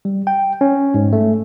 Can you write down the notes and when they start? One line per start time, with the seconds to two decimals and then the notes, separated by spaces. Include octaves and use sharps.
0.05 G3
0.27 G5
0.61 C#4
0.94 G#2
1.13 A3